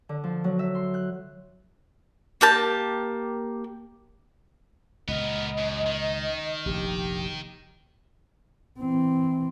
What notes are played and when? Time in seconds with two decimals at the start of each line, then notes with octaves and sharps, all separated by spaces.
0.09 D3
0.24 F3
0.44 F#3
0.59 E5
0.75 C6
0.94 F#6
2.41 A#3 G4 A5
5.08 C#2 A#2 B3 A#4 D#5
5.58 F#2
5.86 D#3
6.66 F1 A#1 G4
8.79 E3 C4